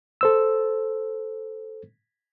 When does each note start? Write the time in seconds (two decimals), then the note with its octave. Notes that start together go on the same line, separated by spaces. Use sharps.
0.21 A4 C5 E6